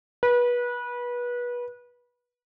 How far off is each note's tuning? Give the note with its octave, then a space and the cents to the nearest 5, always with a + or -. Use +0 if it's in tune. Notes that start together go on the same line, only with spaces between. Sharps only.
B4 -25